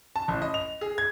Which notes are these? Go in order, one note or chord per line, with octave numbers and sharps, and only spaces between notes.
A5
A1
D#5
F7
G#4
G#6